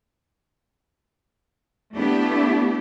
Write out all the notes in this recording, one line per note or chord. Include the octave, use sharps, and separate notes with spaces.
A3 B3 D4 E4 G4